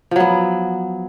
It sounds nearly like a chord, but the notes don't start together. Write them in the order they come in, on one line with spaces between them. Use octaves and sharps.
F3 F#3 B3